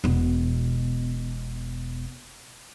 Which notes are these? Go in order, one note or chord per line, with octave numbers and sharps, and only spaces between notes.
E1 B2